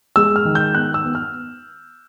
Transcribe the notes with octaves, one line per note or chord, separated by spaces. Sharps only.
G#3 E6
F6
D#3
G6
B3 F#6
E6
B3
F6